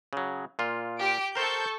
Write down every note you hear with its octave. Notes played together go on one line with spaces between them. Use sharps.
C#3 F#3
A#2 F4
G4 D7
A4 A#4 C5 C#6 G6